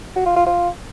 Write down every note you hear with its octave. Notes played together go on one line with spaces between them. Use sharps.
F#4
F4
F4
F4